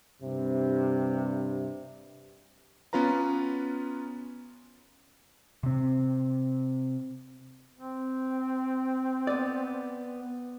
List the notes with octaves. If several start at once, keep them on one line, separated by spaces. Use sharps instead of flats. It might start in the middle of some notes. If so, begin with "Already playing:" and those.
G2 C3
B3 C#4 F4 B4 A#5
C3 C4
C4
B3 D5